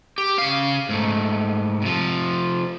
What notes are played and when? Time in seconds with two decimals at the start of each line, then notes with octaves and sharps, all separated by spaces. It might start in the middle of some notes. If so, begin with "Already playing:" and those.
0.18 G4
0.38 C#3 F5
0.89 G#2 A3
1.82 C3 F3